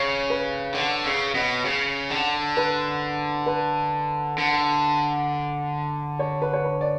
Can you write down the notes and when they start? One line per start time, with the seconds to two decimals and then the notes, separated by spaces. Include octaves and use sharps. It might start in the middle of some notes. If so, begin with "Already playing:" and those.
Already playing: C#3 C#5
0.30 B4
0.74 D3
1.06 C#3
1.35 B2
1.65 C#3
2.10 D3
2.57 B4
3.46 B4
4.38 D3
6.19 C#5
6.42 B4
6.53 C#5
6.64 B4
6.81 D5